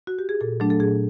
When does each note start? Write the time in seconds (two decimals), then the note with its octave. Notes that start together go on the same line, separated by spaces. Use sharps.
0.07 F#4
0.19 G4
0.29 G#4
0.41 A#2 A4
0.60 F#3 A3 D4
0.70 A4
0.80 A#2 G#4